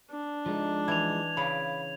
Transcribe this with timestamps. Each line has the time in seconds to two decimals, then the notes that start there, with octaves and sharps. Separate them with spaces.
0.11 D4
0.46 F3 G#3 D#4
0.88 E3 G#6 F7
1.37 C#3 F5 B5